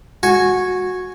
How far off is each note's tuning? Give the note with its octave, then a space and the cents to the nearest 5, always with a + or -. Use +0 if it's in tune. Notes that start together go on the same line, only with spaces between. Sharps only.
F#4 -15 G#5 +0